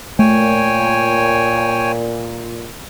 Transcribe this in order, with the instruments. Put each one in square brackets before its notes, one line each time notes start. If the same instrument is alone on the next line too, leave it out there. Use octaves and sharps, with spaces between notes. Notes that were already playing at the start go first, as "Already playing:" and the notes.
[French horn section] A#2 [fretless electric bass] A3 [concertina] C#5 G5 G#5